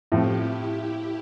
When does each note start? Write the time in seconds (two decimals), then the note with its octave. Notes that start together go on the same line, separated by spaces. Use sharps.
0.12 A2 F3 C4 E4 G4
0.52 E4 G4